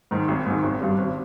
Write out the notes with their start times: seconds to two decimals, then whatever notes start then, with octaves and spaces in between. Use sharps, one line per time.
0.11 G#2 D#3
0.28 G#1
0.46 G#2 D#3
0.63 G#1
0.81 G2 G3
0.98 G#1